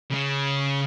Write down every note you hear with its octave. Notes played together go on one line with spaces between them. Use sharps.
C#3 C#4